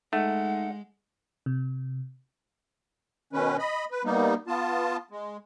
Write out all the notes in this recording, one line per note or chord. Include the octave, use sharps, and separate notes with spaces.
G#3 A3 D#4 F#5
C3
B2 D#3 C#4 B4
D#5 B5
B4
G3 A#3 B3 D#4
B3 F4 A5
G#3